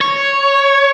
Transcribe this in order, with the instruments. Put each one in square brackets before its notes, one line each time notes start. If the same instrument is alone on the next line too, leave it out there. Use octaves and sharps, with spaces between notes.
[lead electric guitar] C#5